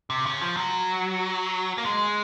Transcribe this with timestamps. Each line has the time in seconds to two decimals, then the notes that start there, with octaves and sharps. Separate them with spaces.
0.10 C3
0.26 C#3
0.41 F3
0.57 F#3
1.78 A#3
1.85 G#3